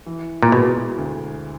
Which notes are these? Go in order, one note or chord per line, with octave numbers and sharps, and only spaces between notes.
E3
A#2
B2 G#3
D2